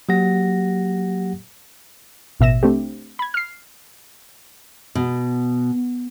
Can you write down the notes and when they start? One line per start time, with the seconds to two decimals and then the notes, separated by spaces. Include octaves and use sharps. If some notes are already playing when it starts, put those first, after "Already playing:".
0.09 F#3 A#3 G4 F#5 A#6
2.40 A1 B2 E5 A#6 E7
2.63 A3 C4 D4 G4
3.19 B5 G#6
3.34 F6 C7
4.95 B2